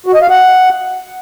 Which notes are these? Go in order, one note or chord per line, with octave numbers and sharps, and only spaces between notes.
F#4
D#5
F5
F#5